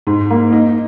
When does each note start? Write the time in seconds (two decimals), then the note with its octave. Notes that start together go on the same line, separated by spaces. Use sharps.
0.07 G#2
0.30 A#3
0.52 D#4